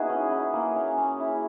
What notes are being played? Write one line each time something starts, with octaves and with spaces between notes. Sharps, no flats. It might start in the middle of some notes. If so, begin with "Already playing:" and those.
Already playing: A#3 B3 D#4 E4 F#4 G#4
C#4
E4
A#3
C#4
C#4
E4